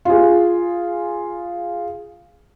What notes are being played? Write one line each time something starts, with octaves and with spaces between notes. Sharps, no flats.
F4 G#4